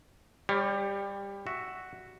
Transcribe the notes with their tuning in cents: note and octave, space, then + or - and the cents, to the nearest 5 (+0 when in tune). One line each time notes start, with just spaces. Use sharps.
G3 +20 G4 +10 C#5 -10
F#4 +0 E5 +0